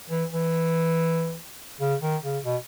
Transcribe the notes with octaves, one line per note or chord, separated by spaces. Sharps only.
E3
E3
C#3
D#3
C#3
B2